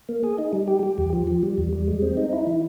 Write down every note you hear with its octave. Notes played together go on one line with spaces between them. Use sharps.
A#3
G#4
D#4
G3
G4
G4
E2
F3
F3
G3
E2
G3
G#3
C4
D#4
E4
E3